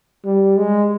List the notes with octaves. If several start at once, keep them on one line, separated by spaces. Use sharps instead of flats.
G3
G#3